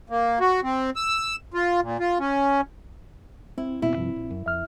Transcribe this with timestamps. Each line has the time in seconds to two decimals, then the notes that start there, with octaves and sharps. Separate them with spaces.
0.10 A#3
0.40 F#4
0.63 C4
0.96 E6
1.54 F4
1.81 A#2
2.00 F4
2.19 C#4
3.58 C4 E4
3.82 A1 E2 B2 E4
3.96 G2 C3 F3
4.16 A#1
4.31 F#2
4.46 F2 E5 F6